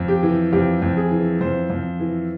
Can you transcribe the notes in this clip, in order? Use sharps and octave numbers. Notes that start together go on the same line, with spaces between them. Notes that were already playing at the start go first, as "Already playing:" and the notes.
Already playing: F2
G4
E3
F2 G4
F2
G#4
E3
F2 C5
F2
E3